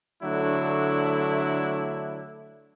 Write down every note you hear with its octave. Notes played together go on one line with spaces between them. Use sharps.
D3 F#3 A3 D4 E4